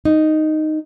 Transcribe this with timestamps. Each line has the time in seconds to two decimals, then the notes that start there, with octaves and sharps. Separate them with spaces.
0.05 D#4